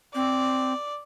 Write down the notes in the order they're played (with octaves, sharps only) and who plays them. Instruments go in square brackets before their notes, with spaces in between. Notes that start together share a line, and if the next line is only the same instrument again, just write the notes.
[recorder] C4 [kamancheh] D5